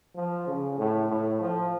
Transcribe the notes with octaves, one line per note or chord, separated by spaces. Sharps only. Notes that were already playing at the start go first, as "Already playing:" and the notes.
F3
C#3
A2
A2
F3